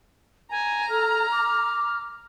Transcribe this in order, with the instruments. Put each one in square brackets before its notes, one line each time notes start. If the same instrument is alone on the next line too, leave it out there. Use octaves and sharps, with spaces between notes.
[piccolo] G#5 [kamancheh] A#5
[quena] A4 [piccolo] F6
[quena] D6